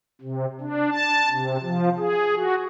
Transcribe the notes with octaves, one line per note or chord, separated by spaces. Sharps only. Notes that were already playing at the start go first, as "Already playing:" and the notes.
C3
D4
A5
C3
F3
G#4
F#4